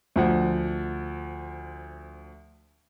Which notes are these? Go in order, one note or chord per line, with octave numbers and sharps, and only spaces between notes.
D2 F3 F#5